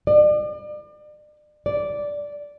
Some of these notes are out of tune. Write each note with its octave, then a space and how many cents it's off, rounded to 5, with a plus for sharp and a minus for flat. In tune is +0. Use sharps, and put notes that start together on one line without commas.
D5 +40
D5 -10